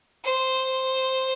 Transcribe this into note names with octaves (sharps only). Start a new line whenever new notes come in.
C5